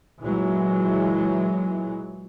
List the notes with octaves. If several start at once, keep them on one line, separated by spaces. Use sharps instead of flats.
A#2 E3 F#3 G#3